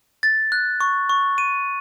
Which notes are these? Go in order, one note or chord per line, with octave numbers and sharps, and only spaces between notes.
A6
F#6
C#6
C#6
D#7